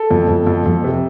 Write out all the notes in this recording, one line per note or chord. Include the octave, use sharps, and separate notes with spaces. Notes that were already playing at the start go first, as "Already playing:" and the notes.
Already playing: A4
F2
F2
F2
F2
C3